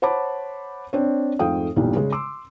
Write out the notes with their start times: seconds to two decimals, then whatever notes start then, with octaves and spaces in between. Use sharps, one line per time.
0.02 C5 C#5 F#5 A5 B5 D6
0.93 C4 D4 C#5
1.39 F2 G#2 A3 F5 G5 D#6
1.76 B1 E2 G2 A#2 G3
1.96 C#3 G#3
2.12 C6 D6 E6